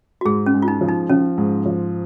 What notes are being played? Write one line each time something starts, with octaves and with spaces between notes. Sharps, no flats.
F#4
G#2 G#4
C#4
G#3
F4
D#4
F3
D#4
F3 C#4
G#2
F3